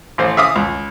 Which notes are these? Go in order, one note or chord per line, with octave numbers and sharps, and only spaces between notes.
A1 C5
E5 F5 D6 D#6
C#2